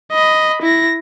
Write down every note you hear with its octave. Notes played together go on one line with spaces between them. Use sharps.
D#5 B5
E4 A#6